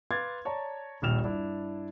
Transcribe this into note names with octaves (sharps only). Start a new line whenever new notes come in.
B4 F5 C6 D6 G#6 A6
C#5 D5 A5 A#5
D#1 A#1 G3 F6 E7 F7
G2 D4 E4